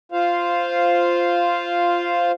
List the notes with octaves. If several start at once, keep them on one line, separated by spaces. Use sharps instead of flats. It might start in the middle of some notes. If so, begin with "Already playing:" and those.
F4 C5 F5